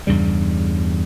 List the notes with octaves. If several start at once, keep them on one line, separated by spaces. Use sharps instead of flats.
E2 G2 C#3 G3